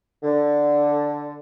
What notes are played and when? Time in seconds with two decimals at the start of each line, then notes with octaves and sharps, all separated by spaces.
0.23 D3